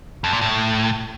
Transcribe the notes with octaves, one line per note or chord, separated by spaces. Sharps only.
F2
A#2
A2